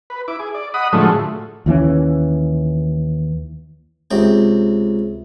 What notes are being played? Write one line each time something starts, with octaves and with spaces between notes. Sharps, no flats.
B4
E4 D6
G#4
D5
D#5 F#5 B5 D#6
A2 D3 F3 F#3 G#3 A3
D#2 E3 A3 C#4
C#2 C3 G5